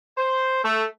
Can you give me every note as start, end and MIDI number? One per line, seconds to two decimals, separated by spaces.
0.18 0.63 72
0.64 0.84 57